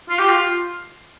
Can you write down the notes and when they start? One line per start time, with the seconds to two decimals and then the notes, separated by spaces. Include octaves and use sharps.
0.09 F4
0.19 G4
0.29 F4